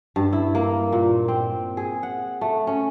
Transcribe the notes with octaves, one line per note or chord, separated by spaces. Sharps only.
G2
E4
A#3
A#2
C4
G#4
F#5
A3
C#4